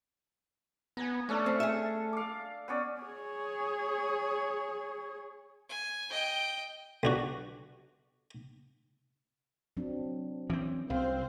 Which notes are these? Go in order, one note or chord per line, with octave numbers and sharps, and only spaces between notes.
B3 G#5 A#5
A3 C#4 D4 A4
C4
G#4 E5
F5 D6
B3 C#4 D5
G#4 C#5
G#5
D#5 G5
B1 D4 F#4
F#3 C4 D4
E3 C4 C#4
C2 C4 C5 F5